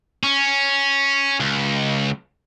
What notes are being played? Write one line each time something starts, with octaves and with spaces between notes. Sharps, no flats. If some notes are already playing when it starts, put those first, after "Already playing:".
C#4
C#2